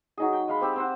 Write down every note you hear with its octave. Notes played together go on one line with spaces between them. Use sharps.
F#3 D#4 G#4
G5
G#3 F5 B5
C4 G4 E6
C4 C5 F#5